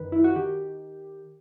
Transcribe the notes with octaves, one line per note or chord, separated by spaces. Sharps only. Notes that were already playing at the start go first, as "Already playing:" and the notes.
Already playing: F#2 D#3 B4
E4
F#4
D#3 G4